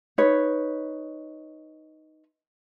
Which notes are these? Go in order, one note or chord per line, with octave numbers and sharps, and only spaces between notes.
D#4 B4 C#5